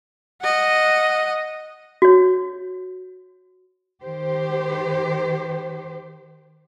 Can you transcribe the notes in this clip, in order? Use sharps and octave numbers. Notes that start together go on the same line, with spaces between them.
D#5 F#5
F#4 C#5
D#3 G4 C5